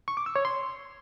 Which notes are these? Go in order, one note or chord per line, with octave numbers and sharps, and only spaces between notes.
C#6
D6
E6
C#5
C6